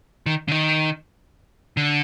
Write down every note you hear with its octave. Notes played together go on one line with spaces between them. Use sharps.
D#3
D3
D#3
D3